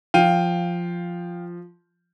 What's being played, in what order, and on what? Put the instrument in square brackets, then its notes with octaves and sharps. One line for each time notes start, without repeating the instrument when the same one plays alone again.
[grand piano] F3 [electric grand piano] F5 G5 D#7